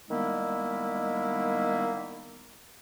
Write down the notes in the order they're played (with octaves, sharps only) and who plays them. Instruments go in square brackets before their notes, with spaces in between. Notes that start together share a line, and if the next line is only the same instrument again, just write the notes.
[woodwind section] D#3 G3 G#3 A#3 B3 E4